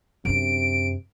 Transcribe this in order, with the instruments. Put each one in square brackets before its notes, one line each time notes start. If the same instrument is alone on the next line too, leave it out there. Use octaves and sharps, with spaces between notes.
[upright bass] F#2 D4 [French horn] C3 [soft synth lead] D7